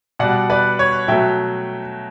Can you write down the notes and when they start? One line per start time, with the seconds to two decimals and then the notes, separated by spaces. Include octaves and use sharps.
0.19 B2 G3 D5 F#5
0.50 B4 D5
0.79 C#5
1.08 B2 F#3 A3 E5 G5